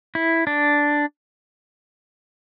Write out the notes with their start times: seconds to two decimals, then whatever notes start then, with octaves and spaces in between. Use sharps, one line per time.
0.15 E4
0.47 D4